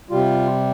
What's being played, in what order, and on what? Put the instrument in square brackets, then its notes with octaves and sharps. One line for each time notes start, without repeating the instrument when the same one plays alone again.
[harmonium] C3 G3 F4